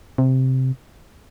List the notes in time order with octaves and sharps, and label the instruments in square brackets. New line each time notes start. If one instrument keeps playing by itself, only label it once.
[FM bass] C3